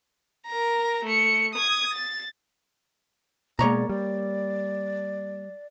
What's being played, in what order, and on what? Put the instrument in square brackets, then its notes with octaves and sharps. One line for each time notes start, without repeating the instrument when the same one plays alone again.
[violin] A#4 A#5
A3 C#7
D#6 G#6
A6
[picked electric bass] B2 G#3 [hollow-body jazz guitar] A#3 C#5 A#5 [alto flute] D5
[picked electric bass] G3 [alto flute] D5